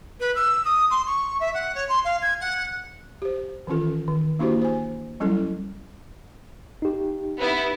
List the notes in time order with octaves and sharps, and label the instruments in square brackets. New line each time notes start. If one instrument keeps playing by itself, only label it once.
[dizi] B4
E6
D#6
C6
C#6
E5
F#5
C#5
C6
F5
G#6
F#5
[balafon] G4 C5
D#3 E3 C#4 F4 A4
D#3
A#3 D4 E4 F#4 G4 C5
C5 G#5
F#3 G3 C#4 E4 A4
[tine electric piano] D#4 G4
[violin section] B3 E4